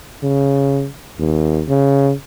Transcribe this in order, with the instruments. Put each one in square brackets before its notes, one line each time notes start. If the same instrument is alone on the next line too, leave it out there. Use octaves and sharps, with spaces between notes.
[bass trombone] C#3
D#2
C#3